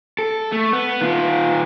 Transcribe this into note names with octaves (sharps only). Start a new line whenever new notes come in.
A4
A3
B3
D#3 F4